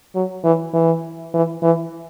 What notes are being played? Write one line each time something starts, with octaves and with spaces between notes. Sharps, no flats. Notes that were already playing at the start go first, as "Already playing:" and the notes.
F#3
E3
E3
E3
E3